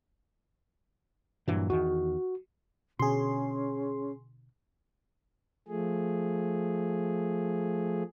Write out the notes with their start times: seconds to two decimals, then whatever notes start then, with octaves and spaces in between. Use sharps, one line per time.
1.48 G2 A#2 E3 F#3
1.70 E2 D#3 F#4
2.99 B2 D3 C#4 G#4 C6
5.68 F3 A3 G#4